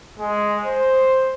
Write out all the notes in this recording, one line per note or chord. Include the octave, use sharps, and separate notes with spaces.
G#3
C5